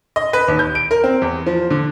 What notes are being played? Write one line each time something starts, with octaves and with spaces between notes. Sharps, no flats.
D#5
B4
D#2
G6
D7
A#4
C4
E2
F3
D3